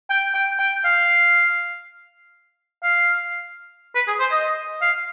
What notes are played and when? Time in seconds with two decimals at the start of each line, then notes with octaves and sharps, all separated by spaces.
0.10 G5
0.35 G5
0.59 G5
0.85 F5
2.83 F5
3.95 B4
4.08 G#4
4.20 C5
4.32 D#5
4.82 F5